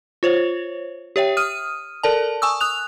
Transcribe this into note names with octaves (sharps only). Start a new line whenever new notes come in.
F4 C5 C#5
G4 C#5 E5 G5
D#6 F6 D#7
A4 A#4 D5 A5
G#5 C#6 D#6 E6
D#6 F#6 F7